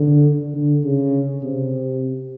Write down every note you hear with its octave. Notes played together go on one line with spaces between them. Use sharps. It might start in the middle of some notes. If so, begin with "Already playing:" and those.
Already playing: D3
D3
C#3
C3